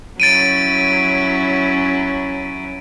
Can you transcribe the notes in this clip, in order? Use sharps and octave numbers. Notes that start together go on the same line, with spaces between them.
F#3 C#4 E4 A6 D7 D#7